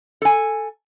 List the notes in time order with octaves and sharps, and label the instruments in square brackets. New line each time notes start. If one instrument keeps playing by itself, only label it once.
[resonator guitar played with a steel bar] A4 G#5